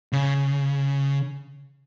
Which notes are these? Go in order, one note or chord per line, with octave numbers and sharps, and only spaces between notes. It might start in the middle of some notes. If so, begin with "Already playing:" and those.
C#3